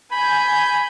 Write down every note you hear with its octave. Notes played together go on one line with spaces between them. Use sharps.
G#5 B5 G6